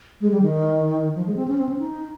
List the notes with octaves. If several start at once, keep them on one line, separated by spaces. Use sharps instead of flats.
G#3
G3
D#3
F3
G#3
C4
C#4
C4
C#4
D#4